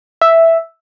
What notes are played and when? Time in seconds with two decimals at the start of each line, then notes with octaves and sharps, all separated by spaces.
0.22 E5